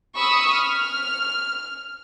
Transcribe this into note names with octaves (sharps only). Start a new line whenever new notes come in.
B5 C#6 D#6 E6
F6